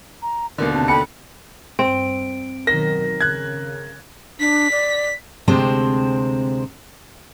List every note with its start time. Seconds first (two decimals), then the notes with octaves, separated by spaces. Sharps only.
0.22 A#5
0.58 D#2 B2 D3 A#4
0.75 C3 A5
0.88 A4 G5 B5 C#7
1.79 G2 C4 D7
2.67 B2 D#3 F#3 A#4 A#6
3.21 C#3 F#6 G#6
4.39 D4 B6
4.72 D5
5.48 D2 C3 G#3 C4 C5 A5